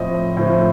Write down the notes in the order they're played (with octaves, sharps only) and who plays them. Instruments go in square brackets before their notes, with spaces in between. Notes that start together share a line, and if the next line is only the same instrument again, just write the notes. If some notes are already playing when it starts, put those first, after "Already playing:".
Already playing: [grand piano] A2 F3 C4 D#5
A2 F3 C4